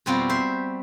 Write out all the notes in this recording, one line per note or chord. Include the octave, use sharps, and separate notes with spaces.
F2 B2 G3 C4 F4 F#4
C5 E5